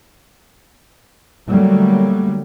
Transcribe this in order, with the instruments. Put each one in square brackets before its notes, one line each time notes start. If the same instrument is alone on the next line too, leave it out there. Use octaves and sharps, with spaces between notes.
[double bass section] D3 F#3 G3 A3 A#3